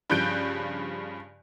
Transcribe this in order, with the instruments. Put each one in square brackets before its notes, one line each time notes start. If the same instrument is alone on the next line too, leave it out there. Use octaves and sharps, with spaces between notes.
[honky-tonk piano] G2 C#3 F3 F#6 G6 D7